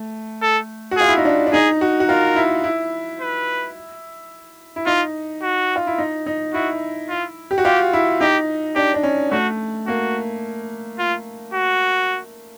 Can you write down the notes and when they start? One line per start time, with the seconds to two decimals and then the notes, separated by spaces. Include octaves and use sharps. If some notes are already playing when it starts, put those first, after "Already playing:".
Already playing: A3
0.42 A4
0.91 F#4
0.97 F4 G#4
1.08 E4
1.17 D#4
1.25 D4
1.47 D4
1.52 D#4 G#4
1.81 F#4
2.00 F#4
2.09 F4 A#4
2.36 E4
2.64 E4
3.20 B4
4.76 E4
4.86 D#4 F4
5.42 F#4
5.76 F4
5.87 E4
5.98 D#4
6.26 D#4
6.53 E4 F#4
7.09 F4
7.51 G4
7.58 F#4
7.64 F4 G4
7.93 E4
8.21 D#4 G4
8.76 D4 G4
8.94 D4
9.03 C#4
9.31 A3 F#4
9.87 A#3 F#4
10.99 F4
11.54 F#4